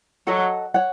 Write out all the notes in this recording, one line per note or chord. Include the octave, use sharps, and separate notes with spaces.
F#3 A4 D#5 F#5
C#5 F#5